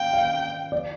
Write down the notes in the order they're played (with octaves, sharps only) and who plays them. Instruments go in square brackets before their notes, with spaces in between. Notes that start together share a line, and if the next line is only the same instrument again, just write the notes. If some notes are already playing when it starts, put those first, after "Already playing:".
Already playing: [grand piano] F5 [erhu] G5
[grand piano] F5
D5